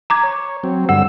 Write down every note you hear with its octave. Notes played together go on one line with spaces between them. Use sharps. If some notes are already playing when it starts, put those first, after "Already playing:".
A#5 D6 G#6
C#5
F#3 C4
G2 D3 F#5 E6